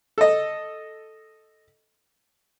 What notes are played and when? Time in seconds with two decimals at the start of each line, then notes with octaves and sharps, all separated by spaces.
0.18 A4 D#5